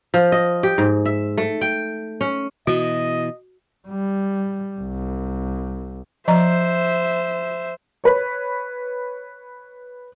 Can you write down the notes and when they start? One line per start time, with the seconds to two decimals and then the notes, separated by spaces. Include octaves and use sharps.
0.14 F3
0.32 D#5
0.63 G4
0.78 G#2
1.05 E5
1.37 A3
1.61 G5
2.21 C#4
2.67 B2 E3 F#4 D#5
3.88 G3
4.80 C2
6.28 F3 C5 D#5 E5 A#5
8.04 B4 C#5